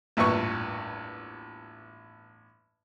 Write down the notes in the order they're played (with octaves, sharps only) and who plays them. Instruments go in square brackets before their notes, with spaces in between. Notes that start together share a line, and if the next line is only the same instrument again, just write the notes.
[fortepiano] A1 E2 G2 A#2 B4 C#6